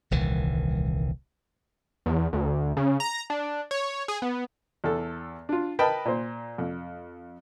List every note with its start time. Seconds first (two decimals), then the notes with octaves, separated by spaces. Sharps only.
0.11 D#1 C2 D#3 E3
2.06 E2
2.33 D2
2.77 C#3
3.00 A#5
3.30 D4
3.71 C#5
4.08 G#4
4.22 B3
4.84 E2 A4
5.49 D4 F4
5.79 A#4 B4 D#5 G5 A5 B5
6.05 A#2 C5
6.58 F2